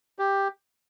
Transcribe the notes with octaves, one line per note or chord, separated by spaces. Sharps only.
G4